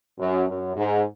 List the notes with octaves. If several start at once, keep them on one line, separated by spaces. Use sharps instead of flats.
F#2
F#2
G#2